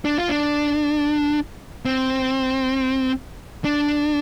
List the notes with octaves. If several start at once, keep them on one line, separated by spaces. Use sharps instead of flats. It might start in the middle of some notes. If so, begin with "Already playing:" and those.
D4
F4
D4
C4
D4